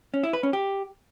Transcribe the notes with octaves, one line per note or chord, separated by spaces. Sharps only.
C#4
E4
B4
C#4
G4